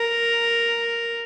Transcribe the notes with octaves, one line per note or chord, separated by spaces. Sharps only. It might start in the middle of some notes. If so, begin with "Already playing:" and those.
Already playing: A#4